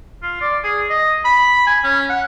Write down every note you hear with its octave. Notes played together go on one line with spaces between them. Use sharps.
F4
D5
G#4
D#5
B5
G#5
C#4
F#5